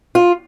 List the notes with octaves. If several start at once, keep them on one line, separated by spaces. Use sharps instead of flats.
F4